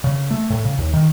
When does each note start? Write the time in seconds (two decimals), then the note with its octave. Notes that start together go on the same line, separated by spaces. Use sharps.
0.04 C#3
0.31 A3
0.50 A2
0.65 C#3
0.79 D#2
0.94 D#3